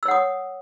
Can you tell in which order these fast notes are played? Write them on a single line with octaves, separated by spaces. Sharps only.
E6 C#5 F#5 D#6